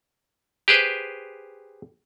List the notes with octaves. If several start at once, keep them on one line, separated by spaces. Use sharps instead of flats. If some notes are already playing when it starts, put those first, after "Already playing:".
G4 G#4 B4 C5